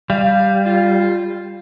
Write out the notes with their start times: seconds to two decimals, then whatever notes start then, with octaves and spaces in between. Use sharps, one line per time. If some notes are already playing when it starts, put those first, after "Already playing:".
0.10 G3 F5
0.66 F4